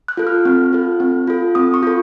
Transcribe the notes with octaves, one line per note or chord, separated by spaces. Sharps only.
F#6
F4 A4
F6
C4
F4 A4
C4
F4 A4
C4 D#6
C#6
F4 A4